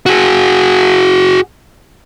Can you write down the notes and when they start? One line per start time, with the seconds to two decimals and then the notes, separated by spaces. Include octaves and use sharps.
0.06 F#4 G#4